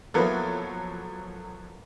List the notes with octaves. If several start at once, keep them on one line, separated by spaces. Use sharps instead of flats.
F3 F#3 A#3 B3 E4 A4